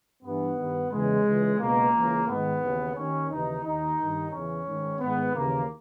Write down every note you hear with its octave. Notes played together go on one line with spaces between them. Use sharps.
G2 E3 B3
G2 D#3
E2 C#3 E3 G#3
C#2 C#3 E3
C#2 B2 A#3
C#2 C#3 E3
G#2 D#3 B3
D#2 C#3 E3
D#2 D#3 C#4
D#2 C#3 E3 D#4
D#2 D#3 D#4
G2 D#3
E2 C#3 E3 C#4
G#2 D#3
G#2 D#3 B3
D#2 C#3 E3 A#3